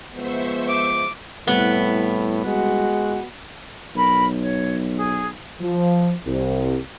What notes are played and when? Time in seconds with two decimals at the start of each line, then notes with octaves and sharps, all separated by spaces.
0.13 F3 G#3 B3 C5 E5 C#6
0.69 D6
1.48 C2 A2 A3 B3
2.46 G#3 F#4
3.95 B1 A#4 B5
4.41 C#5
4.96 G#4
5.61 F3
6.26 C2